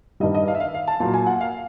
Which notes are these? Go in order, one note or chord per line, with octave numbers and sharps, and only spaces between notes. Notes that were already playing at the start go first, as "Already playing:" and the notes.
G2 D#3 G3 D#5
D#5
F5
E5
F5
F5
A5
A#2 F#3 A#3 A5
G#5
F#5
F5